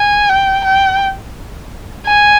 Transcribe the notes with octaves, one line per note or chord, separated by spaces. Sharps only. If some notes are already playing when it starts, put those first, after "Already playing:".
Already playing: G#5
G5
G5
G#5